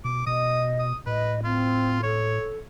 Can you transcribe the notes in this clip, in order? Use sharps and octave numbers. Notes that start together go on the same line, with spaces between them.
B2 D6
B2 D#5 D#6
D#6
A2 B4 D#5
C4 F4
A4 C#5